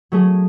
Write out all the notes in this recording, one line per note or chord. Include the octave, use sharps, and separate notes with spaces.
F#3 A3 C#4 G#4